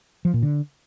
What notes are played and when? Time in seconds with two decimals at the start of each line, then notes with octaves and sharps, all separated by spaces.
0.25 F3
0.34 A#2
0.43 D3